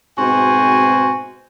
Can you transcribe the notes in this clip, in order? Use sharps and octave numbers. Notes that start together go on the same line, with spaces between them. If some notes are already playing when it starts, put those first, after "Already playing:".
G#2 B2 C4 F#4 C5 G#5